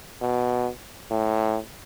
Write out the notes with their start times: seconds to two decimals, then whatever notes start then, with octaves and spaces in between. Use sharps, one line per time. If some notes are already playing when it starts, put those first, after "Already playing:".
0.21 B2
1.11 A2